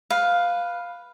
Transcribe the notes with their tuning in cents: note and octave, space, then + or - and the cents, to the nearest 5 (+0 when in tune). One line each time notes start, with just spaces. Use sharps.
B4 +0 F5 +5